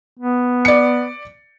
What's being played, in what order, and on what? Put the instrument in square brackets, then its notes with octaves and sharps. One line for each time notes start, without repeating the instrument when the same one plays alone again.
[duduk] B3
[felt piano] D5 C#7